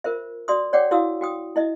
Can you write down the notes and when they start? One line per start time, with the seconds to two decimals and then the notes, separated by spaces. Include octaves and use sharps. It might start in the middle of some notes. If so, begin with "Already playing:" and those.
0.04 F4 A#4 C5 E5
0.48 F#4 D5 E5 C6 D#6
0.73 C#5 D5 F#5 G5 D6
0.91 E4 F#4 F5 D#6 E6
1.21 F#4 G5 D#6
1.56 E4 D#5 E5